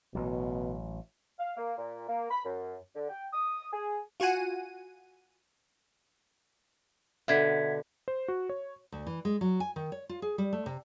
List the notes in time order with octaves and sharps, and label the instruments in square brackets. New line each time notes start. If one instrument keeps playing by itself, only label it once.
[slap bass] A1 F#3 [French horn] B2
[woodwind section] F5
A#3
A#2
A#3
B5
F#2
D3
G5
D#6
G#4
[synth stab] F4 F#4 F#5 G#5 D#7
[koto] B2 D3 [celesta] E5 G#6 B6
[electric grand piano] C5
F#4
C#5
[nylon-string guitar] D2
E3
G#3
F#3
G#5
D#3
C#5
F4
G#4
G3
A3
C3